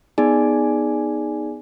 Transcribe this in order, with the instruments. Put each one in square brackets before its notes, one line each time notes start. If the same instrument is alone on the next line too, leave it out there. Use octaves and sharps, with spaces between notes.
[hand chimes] B3 D#4 G#4 D5 G#5